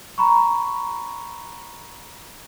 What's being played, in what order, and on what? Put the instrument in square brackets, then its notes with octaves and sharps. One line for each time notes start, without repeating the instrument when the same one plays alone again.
[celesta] A#5 B5 C#6